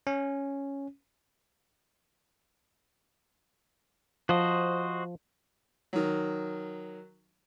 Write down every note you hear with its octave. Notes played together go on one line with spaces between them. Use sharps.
C#4
F3 F#4 C5 D#5
D#3 F#3